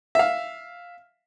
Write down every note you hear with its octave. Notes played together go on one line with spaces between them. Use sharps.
E5 F5